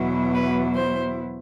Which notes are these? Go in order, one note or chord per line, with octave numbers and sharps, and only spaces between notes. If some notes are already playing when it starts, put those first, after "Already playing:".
Already playing: E2 B2 F#3 B3 E4
B4
C5